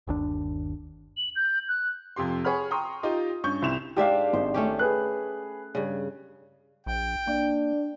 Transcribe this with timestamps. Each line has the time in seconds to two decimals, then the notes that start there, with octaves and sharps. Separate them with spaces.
0.07 G1 D#2 D4
1.17 F#7
1.35 G6
1.68 F#6
2.16 F2 C3 G4 C6
2.44 G#4 C#5 F#5 B5 F6
2.71 G5 A#5 C6 C#6 D#6
3.03 D#4 F4 G4 D#5
3.44 G2 C#4 C#6 G6
3.62 C2 C4 E4 E7 F7
3.97 G#2 D4 G4 E5 F5
4.33 G#1 C5
4.54 A3 C#4 G4
4.79 G#4 B4 F#6
5.75 G2 C#3
6.86 A#1 G5
7.27 A#3 D4